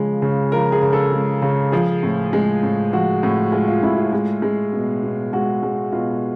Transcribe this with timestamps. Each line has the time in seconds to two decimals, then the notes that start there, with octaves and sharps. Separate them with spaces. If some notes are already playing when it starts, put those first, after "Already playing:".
Already playing: C#3 F3 G#3
0.22 C#3
0.52 F3 A#4
0.72 G#4
0.82 C#3
0.93 A4
1.13 G#3
1.42 C#3
1.72 F3 G#4
2.03 A2
2.33 G#3
2.63 A2
2.93 F3 F#4
3.23 A2
3.52 G#3 F4
3.68 F4
3.83 A2 E4
3.98 F4
4.13 G#3
4.42 G#3
4.73 B2
5.03 B2
5.33 G#3 F#4
5.63 G#3
5.92 B2 F4